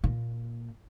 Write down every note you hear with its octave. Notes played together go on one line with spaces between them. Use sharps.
A#2